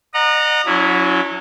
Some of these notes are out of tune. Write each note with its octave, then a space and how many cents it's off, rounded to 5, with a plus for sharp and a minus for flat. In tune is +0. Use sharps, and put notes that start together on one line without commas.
D#5 -40 F#5 -15 A#5 +0
F#3 -25 C#4 +30 E4 +0